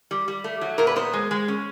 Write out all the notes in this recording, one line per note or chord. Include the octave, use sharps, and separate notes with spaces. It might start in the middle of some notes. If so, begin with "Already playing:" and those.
G3
G3
A3
F#3
A#2 A#4
B4
B3 C5
G#3
G#3
C#4